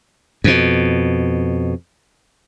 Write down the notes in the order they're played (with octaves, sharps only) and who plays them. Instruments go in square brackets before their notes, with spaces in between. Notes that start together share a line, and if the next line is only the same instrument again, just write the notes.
[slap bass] F2 B2